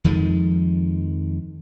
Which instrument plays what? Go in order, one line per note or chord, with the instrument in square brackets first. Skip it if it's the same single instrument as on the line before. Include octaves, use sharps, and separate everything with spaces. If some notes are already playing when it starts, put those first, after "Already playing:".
[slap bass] F2 D#3 F3 G#3